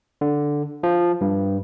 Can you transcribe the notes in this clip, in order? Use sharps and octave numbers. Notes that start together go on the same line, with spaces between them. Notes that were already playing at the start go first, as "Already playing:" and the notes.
D3
F3
G2